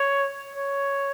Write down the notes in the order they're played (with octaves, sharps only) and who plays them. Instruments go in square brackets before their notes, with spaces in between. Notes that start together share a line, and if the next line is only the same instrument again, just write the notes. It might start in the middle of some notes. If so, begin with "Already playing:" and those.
Already playing: [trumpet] C#5
C#5